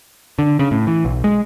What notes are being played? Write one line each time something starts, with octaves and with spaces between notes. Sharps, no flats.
D3
C#3
A2
E3
B1
G#3